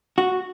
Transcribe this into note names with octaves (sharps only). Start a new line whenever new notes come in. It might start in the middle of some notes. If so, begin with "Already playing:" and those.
F#4